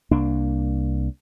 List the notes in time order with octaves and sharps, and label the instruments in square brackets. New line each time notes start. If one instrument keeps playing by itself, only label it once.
[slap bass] C2 A#3 D4